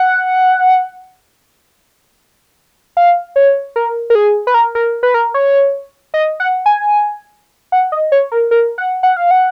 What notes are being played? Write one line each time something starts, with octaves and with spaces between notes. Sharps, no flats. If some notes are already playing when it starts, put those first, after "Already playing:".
Already playing: F#5
F5
C#5
A#4
A#4
G#4
B4
A#4
A#4
B4
A#4
C#5
D#5
F#5
G#5
F#5
D#5
C#5
A#4
A#4
F#5
F#5
F5
F#5